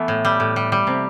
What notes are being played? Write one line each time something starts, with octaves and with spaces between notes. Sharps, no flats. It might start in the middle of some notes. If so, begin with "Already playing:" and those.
Already playing: E3 A3 B3
A2
G3
A2
G3
G3
C3